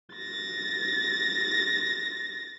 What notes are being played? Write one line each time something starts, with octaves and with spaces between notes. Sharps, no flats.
A6 A#6